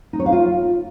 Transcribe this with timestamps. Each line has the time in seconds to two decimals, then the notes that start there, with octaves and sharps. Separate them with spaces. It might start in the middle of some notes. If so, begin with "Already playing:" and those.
0.13 D#4
0.20 C#5
0.26 F5
0.32 F4